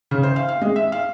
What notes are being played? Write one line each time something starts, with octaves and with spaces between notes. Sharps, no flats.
C#3
C5
F5
F5
G#3
E5
F5